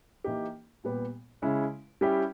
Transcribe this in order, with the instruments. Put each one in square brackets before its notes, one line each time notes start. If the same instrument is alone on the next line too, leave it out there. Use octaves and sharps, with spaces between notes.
[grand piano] E3 A#3 D#4 G4
A#2 G3 B3 G4
C#3 G#3 C#4 E4
G3 C#4 E4 G4